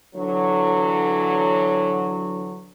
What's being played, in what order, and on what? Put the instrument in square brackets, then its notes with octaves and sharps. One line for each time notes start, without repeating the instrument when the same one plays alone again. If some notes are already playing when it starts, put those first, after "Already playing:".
[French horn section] D3 E3 F#3